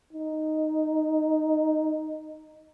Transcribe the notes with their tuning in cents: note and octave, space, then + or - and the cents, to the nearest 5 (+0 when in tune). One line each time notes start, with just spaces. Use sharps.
D#4 -5